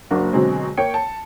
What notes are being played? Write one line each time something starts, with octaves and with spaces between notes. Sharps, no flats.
F#1 A#3 D4 F#4
B2 D3 F#3 G#3 C4
A#3 C#5 G5 C#7
A5